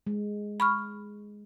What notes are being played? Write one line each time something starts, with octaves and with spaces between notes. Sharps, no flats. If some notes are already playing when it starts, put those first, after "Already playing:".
G#3
B5 C#6 F6